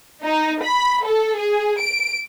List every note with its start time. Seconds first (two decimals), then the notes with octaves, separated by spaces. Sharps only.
0.23 D#4
0.62 B5
1.06 A4
1.38 G#4
1.81 D7